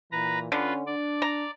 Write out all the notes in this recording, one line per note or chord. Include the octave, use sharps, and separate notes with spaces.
A#2 E3 B4 A#5
D3 C#4 F4 B4
D4 D5
A#5